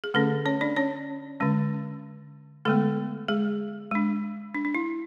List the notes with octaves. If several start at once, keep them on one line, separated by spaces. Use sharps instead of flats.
G#4
D3 A3 C#4 A4
C#4 C#5
D4 D5
C#4 C#5
D3 G#3 C#4
D3 G#3 A3 B3 A4
G#3 G#4
G#3 D4
D4
D4
E4